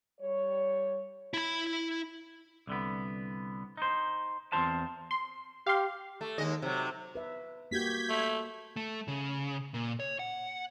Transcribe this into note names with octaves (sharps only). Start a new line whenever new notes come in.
G3 C#5
E4 B5
C2 D3 B3
D#4 C5
E2 C3 C4 F4 C5 A5
C6
G4 F5 C6
A3
D#2 G#3 D#5
C3 F#3
B4 E5
A#3 F#4 G4 G6 G#6 B6
A3
A3
C#3
A#2
C#5
F#5